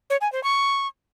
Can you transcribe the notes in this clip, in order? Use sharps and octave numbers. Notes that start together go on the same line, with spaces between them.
C#5
G#5
C5
C#6